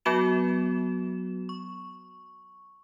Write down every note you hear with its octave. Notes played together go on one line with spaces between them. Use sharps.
F#3 B3 F#4 E7
C#6